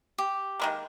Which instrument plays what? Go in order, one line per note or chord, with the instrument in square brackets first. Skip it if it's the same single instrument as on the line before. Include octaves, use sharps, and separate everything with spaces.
[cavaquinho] G4
[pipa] D#3 G#3 A#3